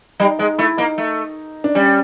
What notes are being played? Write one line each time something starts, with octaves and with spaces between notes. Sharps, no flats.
G3 D#4
G#3 D#4
A3 E4
A#3 D#4
A3
D4
G3 C#4